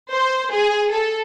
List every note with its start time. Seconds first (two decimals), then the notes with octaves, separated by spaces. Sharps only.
0.11 C5
0.51 G#4
0.91 A4